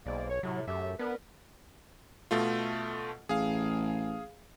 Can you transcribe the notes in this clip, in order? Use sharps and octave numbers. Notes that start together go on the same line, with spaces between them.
B1 G#2 A#3 D5
C#5
A2 C3 F#3
F#2 A3 G4 E5
B3 D4 A#4 B4
B2 A3 F4
A1 G#4 F5